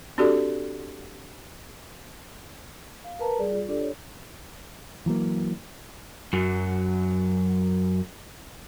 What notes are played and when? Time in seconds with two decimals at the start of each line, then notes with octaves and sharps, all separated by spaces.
0.18 C4 D4 F#4 G4 A4 D5
3.04 F5
3.19 A#4 B4 A5 A#5
3.39 G3 G#4 D5
3.52 F4
3.68 D4 F4 G4 A4 D5
3.81 C#5
5.06 E3 F#3 G#3 A#3
6.33 F#2 F#3